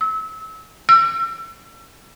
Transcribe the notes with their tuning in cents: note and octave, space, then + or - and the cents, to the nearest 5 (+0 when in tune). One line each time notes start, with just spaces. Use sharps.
E6 -30
E6 +35